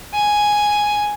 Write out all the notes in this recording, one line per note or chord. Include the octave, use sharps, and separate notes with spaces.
G#5